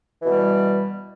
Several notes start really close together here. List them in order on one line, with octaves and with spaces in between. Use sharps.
E3 B2 G3